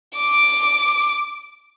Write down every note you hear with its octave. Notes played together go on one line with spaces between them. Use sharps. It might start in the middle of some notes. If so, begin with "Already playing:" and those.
D6